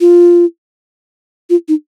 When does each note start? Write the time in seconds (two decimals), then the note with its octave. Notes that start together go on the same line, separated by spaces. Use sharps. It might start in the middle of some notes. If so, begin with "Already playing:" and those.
0.01 F4
1.50 F4
1.68 D#4